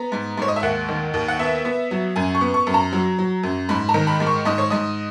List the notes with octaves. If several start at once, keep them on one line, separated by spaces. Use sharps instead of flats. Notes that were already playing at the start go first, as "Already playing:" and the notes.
Already playing: B3 A#5
G#2
G#2 C#5
D#5
E5
D#2 F#5
D#3
D#2
F#5
B3 E5
B3
F#3
F#2 G#5
C#6
B3
C#6
F#2
A#5
F#3
F#3
F#2
G#2 B5
A#5
D#3
B5
G#2
C#6
G#2 D#5
C#5
G#2 D#5